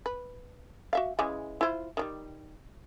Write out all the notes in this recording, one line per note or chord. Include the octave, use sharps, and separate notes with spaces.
B4
F#4 E5 F5
C#3 E3 G#3
E4 F4 C5
D#3 F#3 G3